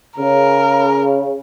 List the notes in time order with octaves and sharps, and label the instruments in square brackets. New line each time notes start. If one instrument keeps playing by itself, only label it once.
[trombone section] C#3 [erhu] A#4